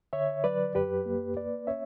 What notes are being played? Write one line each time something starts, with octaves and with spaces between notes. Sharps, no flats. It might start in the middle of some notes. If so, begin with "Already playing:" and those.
D3 C#5 E5
F#3 B4 D5
F#2 G4 B4
A#3
A#3 B4 D5
C#4 C#5 E5